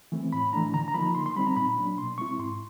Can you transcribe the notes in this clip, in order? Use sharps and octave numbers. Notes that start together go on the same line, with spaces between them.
E3 A3 C4
A2 B5
E3 A3 D4 A#5
D3 A#5
A#5
F3 A#3 D#4 B5
D3 C6
C6
G3 C4 D#4 B5
A#5
A#2 B5
F#3 A#3 D4
B2 C6
G#3 C4 E4 C#6
G#2 C6